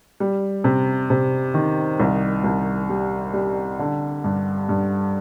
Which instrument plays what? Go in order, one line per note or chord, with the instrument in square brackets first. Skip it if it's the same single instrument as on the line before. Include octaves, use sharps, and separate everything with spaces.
[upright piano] G3
C3
C3
D#3
C2
C2
G3
G3
D3
G2
G2